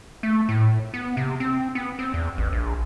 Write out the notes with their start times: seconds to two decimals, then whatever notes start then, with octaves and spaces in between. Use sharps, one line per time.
0.23 A3
0.49 A2
0.94 B3
1.17 C3
1.40 C4
1.75 B3
1.99 C4
2.14 E2
2.38 A1
2.52 A#1